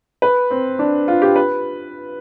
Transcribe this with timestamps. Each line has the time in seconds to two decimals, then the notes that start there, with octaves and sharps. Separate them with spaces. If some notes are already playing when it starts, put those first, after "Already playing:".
0.22 B4
0.51 C4
0.79 D4
1.08 F4
1.22 G4
1.36 B4